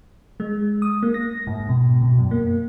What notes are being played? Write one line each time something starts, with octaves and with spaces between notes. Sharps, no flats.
G#3
D#6
A#3
A#6
G#2
B2
B2
F#2
A#3